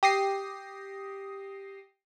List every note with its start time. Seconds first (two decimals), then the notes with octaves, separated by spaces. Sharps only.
0.03 G4 D#6 A#6 C7